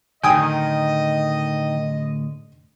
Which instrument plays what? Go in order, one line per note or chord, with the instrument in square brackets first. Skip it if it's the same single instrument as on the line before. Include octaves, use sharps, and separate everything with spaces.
[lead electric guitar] A2 D3 [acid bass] D#3 [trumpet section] D#5 [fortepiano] G5 G#5 D#6